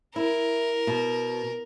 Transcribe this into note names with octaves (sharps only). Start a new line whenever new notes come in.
E4 A#4
B2